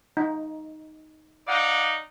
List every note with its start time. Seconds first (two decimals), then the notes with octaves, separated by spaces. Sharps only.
0.17 D#4
1.48 D#4 D5 F5 F#5